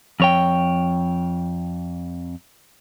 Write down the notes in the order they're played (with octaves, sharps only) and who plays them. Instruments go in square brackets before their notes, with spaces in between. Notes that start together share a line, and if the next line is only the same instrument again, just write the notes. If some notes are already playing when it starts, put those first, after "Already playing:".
[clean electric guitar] F2 C#5 G5